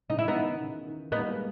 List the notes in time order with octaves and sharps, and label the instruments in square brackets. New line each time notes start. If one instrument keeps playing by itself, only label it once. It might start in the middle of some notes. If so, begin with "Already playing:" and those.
[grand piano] C#3 E3 [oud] D#4
[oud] E4
B3 D#4
[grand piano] D#3
D#3
C#3
D#3
[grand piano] G3 A#3 [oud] B3 D#4
[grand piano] G#3 B3